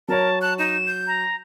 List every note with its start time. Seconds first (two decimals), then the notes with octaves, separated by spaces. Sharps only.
0.08 F#3 A#4 C#5 A5
0.41 A5 F#6
0.59 D#4 E7
0.87 G6
1.07 A#5